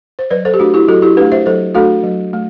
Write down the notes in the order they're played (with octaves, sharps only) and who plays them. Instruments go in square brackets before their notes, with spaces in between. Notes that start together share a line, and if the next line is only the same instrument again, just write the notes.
[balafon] C5
F#3 B4 D5
A4 C5
G4
A3 D4 F#4
E4 G4
F#3 F#4 A4
E4 G4
D4 G4 B4
A3
C5 E5
F#3 A4 C5
A3 D4 F#4 A4
F#3
A3